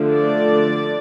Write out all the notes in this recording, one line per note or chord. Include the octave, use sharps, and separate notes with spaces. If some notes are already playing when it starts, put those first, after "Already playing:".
Already playing: D3 F3 A3 D4
D5